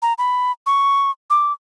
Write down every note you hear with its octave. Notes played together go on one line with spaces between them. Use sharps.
A#5
B5
C#6
D6